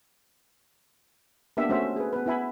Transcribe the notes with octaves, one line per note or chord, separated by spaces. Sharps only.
A#3 B3 D4 G4 E5
A3 C#4 F#4 C5 E5
G#4 B4
B3 B4
B3 E4 E5 G#5 B5